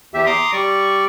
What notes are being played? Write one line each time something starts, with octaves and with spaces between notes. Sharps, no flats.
E2 G4 E5
A#5 C6 D6 D#6
G3 D5 C#6